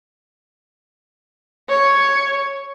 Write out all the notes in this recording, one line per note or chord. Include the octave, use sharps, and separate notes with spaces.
C#5